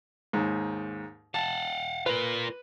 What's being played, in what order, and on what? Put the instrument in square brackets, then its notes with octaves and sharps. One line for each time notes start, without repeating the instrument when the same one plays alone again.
[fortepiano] D#2 G#2
[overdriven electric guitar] F5 F#5 [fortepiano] A5
[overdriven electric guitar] F4 A#4 [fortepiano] B4